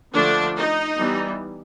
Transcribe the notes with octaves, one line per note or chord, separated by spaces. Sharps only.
D3 F3 A3 D4
D#4
E3 G3 B3